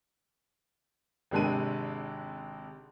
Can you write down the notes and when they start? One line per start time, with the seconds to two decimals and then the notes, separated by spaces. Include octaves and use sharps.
1.31 G#1 C3 G#3 D4 D#7